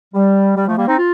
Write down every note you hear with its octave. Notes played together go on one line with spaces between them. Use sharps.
G3
G3
F3 A3
G3 A#3
C4 D#4
F4